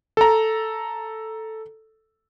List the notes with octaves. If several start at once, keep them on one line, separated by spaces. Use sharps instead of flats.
A4 A#5